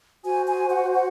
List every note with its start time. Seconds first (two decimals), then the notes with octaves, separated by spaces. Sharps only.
0.24 F#4 C5 G#5
0.48 G#5
0.71 F#5
0.95 F#5